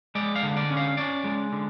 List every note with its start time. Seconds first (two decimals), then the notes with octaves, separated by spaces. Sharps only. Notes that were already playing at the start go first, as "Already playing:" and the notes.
0.15 G#3 D5
0.36 F5
0.43 D3
0.57 D5
0.70 C#4
0.77 F5
0.97 C#4 D5
1.24 G#3
1.52 D3